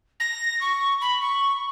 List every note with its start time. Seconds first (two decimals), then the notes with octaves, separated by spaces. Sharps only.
0.20 A#6
0.61 C#6
1.01 B5
1.21 C#6